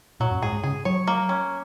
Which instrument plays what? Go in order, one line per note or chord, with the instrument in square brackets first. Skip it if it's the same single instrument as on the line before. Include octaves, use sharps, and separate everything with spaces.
[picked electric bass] A#2 [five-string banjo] F#3
[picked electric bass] F#2
[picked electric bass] G#2 [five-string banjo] G#4
[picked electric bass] G#2
[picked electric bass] C#3 [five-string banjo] G#4
[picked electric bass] F#3 [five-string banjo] C#5
[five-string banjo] A#3
C#4